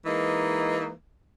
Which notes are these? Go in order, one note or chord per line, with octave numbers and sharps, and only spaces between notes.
E3 G#3 A#3 D#4